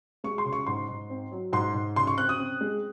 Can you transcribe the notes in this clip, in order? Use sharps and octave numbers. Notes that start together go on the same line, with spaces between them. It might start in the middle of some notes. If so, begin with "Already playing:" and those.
G#3 C#6
C6
C#3
C#6
G#2 C6
G#2
C4
F#3
G#2 C6
G#2
C#3 C6
C#6
C4 F#6
D#6
C4
G#3